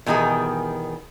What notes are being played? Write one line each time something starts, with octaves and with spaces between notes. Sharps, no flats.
E2 B2 D#3 G3 G#4